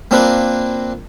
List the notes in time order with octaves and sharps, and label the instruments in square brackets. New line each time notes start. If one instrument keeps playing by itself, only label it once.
[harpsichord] A#3 C4 D4 F4 A#4 B4